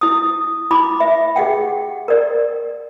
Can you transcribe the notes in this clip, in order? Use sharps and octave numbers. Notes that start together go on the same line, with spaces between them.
E4 D#6
E4 B5 D6
E5
G4 G#4 F#5 G5
A#4 D5